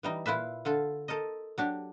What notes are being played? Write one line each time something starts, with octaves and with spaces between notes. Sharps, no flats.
E3 G3 D#4
A#2 E4 F4 B4 E5
D3 F4 A4
A4 A#4 C5 D#5
F#3 D4 G4